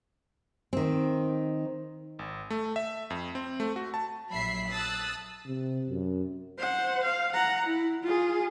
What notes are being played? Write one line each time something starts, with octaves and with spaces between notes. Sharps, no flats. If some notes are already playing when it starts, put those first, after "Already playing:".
D#3 C4
G#1
A3
E5
F2
C4
A3
F#4
A5
A#1 F#3 E5 B5 B6 C7
A5 D#6 E6 F#6 A6
C3
F#2
C5 F#5
F5
F#5 A#5
E4
F4 G#4